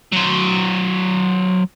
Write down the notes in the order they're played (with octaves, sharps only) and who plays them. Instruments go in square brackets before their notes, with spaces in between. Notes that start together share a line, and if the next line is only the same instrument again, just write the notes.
[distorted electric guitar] F#3 C5